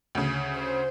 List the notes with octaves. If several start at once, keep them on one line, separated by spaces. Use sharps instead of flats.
D2 C#3
C5